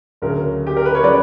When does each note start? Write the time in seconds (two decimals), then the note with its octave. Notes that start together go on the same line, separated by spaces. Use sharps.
0.22 D2 C#3 F#3 A#4
0.67 G4
0.77 A#4
0.85 B4
0.95 C#5
1.03 C#3 F#3 B4 D5